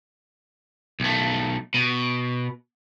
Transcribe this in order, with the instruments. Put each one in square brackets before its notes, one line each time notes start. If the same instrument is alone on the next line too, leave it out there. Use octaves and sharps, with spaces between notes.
[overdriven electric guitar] B1 A3
B2